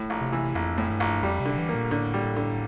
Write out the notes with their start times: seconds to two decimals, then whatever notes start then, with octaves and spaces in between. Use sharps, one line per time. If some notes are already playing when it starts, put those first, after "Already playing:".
Already playing: A2
0.10 A#1
0.21 C3
0.32 E3
0.54 A#1 F2
0.78 A2
0.89 G2
1.00 A#1
1.23 F2 G3
1.40 C3
1.45 D3
1.58 E3
1.69 A#3
1.74 A#2
1.91 A2 D3
2.14 G3
2.36 D3